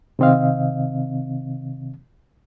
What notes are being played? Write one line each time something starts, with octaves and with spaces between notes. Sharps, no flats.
C3 D#3 C4 D#5 F5